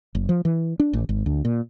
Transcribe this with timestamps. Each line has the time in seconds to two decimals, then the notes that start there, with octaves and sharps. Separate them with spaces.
0.15 F#1
0.29 F3
0.45 E3
0.80 D4
0.93 A1
1.09 G#1
1.26 D2
1.45 A#2